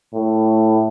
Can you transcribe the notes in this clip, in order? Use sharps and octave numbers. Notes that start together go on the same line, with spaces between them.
A2